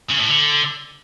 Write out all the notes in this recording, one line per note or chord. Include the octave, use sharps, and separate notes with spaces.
C#3
A2
D3